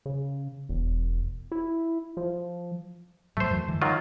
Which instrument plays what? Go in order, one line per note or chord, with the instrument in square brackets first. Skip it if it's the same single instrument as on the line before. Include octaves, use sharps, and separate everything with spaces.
[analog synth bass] C#3
E1
E4
F3
[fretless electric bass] G#2 F#3 [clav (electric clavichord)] A3 C5
[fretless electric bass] F#2 E3
D3 E3 G#3
[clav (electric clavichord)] D#3 F#3 F4